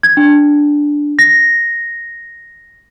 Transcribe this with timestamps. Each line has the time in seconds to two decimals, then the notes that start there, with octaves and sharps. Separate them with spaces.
0.03 G#6
0.17 D4
1.19 A#6